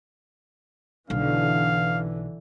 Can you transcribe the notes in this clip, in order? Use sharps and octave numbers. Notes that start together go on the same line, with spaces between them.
B1 D3 E3 F5